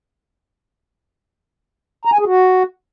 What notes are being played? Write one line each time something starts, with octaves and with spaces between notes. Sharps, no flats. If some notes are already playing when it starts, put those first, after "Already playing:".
A#5
G#5
G#4
F#4